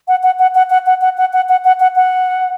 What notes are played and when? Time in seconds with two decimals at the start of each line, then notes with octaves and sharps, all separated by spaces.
0.08 F#5
0.23 F#5
0.39 F#5
0.55 F#5
0.70 F#5
0.86 F#5
1.01 F#5
1.18 F#5
1.33 F#5
1.49 F#5
1.65 F#5
1.80 F#5
1.96 F#5